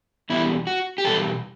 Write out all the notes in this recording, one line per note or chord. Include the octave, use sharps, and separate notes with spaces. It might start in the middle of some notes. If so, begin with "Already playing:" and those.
E2 B2 G3 E4
F#4
G4
E2 B2 G3 A4